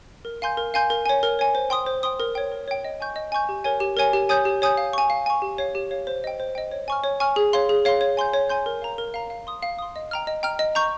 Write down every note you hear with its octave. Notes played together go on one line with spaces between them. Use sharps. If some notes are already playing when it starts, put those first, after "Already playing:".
A#4
F5 G#5 C6 G6
A#4
F5 G#5 C6 G6
A#4
C#5 G#5
A#4
C#5 G#5
C5
G5 C6 D#6
C5
G5 C6 D#6
A#4
C#5 G5
A#4
C#5 G5
D#5
G#5 C#6 G6
D#5
G#5 C#6 G6
G4
A#4 C#5 G#5
G4
A#4 C#5 G#5
G4
C#5 G#5 D#6 G6
G4
C#5 G#5 D#6 G6
F5
G#5 C#6
F5
G#5 C#6
G4
C#5 F5
G4
C#5 F5
C5
D#5 G5
C5
D#5 G5
C#5
G#5 C#6 F6
C#5
G#5 C#6 F6
G#4
C#5 F5 C6
G#4
C#5 F5 C6
C#5
G#5 C6 G6
C#5
G#5 C6 G6
A#4
F5 A#5
A#4
F5 A#5
F5
C6 D#6
F5
C6 D#6
D#5
G5 A#5 F6
D#5
G5 A#5 F6
D#5
A#5 C#6 G6